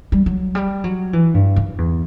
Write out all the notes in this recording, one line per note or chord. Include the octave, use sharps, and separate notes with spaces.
G3
F#3
G3
F#3
E3
G2
F#2
E2